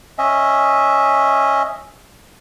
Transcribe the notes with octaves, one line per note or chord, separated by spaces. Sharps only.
C#4 D#5 E5